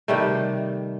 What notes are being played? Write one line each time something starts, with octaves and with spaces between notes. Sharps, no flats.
C3 D#3 G3 A3